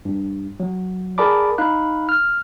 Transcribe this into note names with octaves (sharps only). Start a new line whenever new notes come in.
G2
F#3
G#4 A#4 D5 A5 B5 D6
D#4 F5 B5 F#6
F6